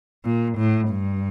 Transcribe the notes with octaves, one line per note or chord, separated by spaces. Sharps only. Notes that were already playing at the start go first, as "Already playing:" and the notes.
A#2
A2
G2